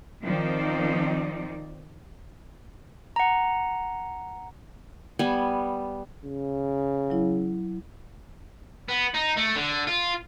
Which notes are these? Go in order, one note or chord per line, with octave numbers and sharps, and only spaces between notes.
D#3 F3 C4 D#4 D5
F#5 A#5
G3 B3 G#5
C#3
F#3 E4
B3
D#4
A3
D3
F4